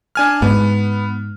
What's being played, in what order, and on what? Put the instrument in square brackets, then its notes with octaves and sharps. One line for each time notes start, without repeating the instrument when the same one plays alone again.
[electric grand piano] D4 G#5 F6
[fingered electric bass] G#2 [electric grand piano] B3